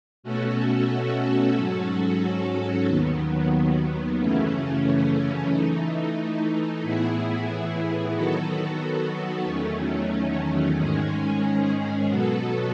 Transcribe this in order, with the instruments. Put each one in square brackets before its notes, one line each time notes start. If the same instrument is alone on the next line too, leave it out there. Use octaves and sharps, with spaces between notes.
[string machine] B2 A3 C#4 F#4 A4
G#2 F#3 C#4 F#4 A4
D#2 D#3 F#3 B3
F#2 C#3 E3 A3 C#4
E3 A3 D#4
A2 E3 B3 E4 G#4
D#3 F#3 B3 F#4 A4
E2 D#3 F#3 A3 C#4
G#2 D#3 G#3 C#4 G#4
B2 F#3 B3 F#4 A4